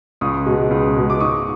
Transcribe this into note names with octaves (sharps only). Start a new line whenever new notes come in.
C#2 C#6 D#6
B2 G#3
C#2
B2 G#3
D6
G#2 C#6 D#6